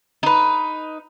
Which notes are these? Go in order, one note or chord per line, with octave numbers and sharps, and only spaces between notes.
D#4 B4